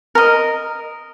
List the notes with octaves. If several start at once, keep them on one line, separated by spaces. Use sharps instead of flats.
A#4 D#5